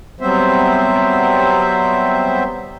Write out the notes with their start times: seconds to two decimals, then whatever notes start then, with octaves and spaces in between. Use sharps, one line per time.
0.21 F#3 G3 B3 C4 C5 E5